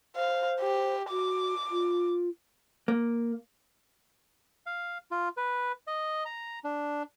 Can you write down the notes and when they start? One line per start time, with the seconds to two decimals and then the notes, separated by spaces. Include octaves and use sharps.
0.16 C5 F5
0.60 G4
1.10 F#4 D6
1.71 F4
2.88 A#3
4.66 F5
5.11 F4
5.37 B4
5.87 D#5
6.25 A#5
6.64 D4